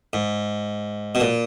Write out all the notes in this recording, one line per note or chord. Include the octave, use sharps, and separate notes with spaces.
G#2
B2
A#2